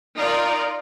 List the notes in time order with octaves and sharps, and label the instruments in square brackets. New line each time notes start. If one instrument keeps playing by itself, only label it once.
[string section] D#4 F4 A#4 D5